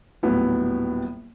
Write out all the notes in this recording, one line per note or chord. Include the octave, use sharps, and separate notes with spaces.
D#1 A2 F#3 B3 E4